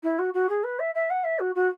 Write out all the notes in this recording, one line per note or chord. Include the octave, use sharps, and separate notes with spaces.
E4
F#4
F#4
G#4
B4
E5
E5
F#5
E5
F#4
F#4